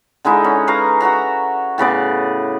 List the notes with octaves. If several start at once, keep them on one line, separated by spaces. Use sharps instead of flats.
D3 G#3 D#4 E4
C#4
B4 F5 A#5 C#6
F#4 E5 F#5 A#5
A2 C#3 B3 D5